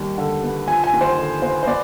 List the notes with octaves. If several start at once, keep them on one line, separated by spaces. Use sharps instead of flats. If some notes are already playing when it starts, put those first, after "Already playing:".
Already playing: D#2 G3
D3
B3
F3 G#5
G#5
D#2
C5
D3
B3 C5
C5
B3 D5